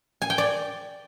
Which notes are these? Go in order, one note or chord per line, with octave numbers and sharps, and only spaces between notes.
G#5
G5
D5